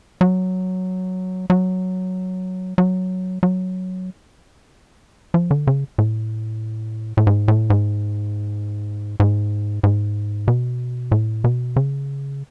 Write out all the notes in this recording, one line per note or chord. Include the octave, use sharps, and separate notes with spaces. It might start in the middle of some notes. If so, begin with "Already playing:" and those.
F#3
F#3
F#3
F#3
F3
D3
C#3
A2
A2
G#2
A2
G#2
G#2
G#2
B2
A2
B2
C#3